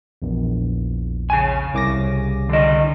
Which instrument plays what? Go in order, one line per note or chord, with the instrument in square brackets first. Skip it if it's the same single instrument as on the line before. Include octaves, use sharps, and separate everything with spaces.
[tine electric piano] A#1 E2
[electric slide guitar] C#3 G#5
[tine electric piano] C2 D6 A#6
[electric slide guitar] D3 D#5